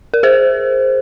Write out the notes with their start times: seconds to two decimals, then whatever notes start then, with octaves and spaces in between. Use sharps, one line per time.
0.14 A#4
0.23 G#4 C5